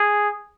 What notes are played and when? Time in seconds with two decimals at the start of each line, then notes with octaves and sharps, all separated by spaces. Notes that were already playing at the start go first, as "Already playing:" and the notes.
Already playing: G#4